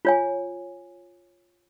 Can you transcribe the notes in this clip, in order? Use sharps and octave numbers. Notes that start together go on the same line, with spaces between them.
F4 C#5 G#5